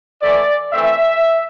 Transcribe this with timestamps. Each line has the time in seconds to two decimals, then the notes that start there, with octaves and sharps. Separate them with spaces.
0.22 E3 A3 E4 D5
0.73 E3 A3 C4 E5